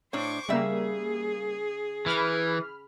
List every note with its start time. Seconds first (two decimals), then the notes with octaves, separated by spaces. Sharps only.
0.13 A2 D4 C5 C#5 C#6 D6
0.49 C#3 G3 A#3 G#4 E5
2.06 E3 B5 F6